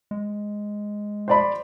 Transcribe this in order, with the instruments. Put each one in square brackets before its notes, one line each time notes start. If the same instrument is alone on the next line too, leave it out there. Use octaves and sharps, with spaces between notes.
[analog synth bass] G#3
[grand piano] C5 D5 B5